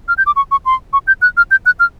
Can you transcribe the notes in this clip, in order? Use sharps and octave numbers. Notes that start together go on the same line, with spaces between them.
F6
G6
D6
C#6
C#6
C6
C#6
G6
F#6
F6
G6
F#6
F6